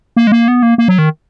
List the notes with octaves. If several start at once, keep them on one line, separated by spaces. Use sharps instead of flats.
A#3
G#3
A#3
B3
A#3
A#3
F#3
D#3